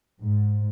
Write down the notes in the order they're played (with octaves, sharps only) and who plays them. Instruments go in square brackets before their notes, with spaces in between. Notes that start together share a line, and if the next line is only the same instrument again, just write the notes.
[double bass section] G#2